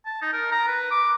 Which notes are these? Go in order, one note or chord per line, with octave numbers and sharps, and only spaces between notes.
A5
D#4
A#4
A#5
B4
D6